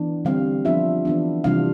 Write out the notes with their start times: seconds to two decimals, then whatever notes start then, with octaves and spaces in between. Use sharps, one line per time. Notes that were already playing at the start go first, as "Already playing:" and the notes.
Already playing: E3 B3 D4
0.25 D3 G3 C4 F5
0.65 F3 B3 D4 F4 E5
1.05 E3 B3 D4
1.44 C3 E3 G3 D4 F4 F5